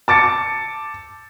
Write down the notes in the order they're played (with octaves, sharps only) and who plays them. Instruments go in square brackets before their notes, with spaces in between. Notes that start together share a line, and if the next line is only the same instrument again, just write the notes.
[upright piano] A5 D6 A6 C#7